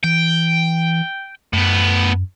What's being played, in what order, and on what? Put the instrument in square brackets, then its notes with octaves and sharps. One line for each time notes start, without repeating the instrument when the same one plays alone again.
[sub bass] E3 [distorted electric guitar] G5
[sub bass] F#2 [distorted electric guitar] A2 B3